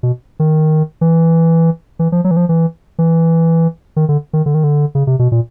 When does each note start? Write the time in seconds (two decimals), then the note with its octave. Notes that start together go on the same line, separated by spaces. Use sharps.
0.03 B2
0.40 D#3
1.01 E3
1.99 E3
2.12 F3
2.24 F#3
2.31 E3
2.37 F3
2.49 E3
2.99 E3
3.96 D#3
4.09 D3
4.33 D#3
4.46 D3
4.55 D#3
4.64 D3
4.95 C#3
5.07 C3
5.19 B2
5.32 A#2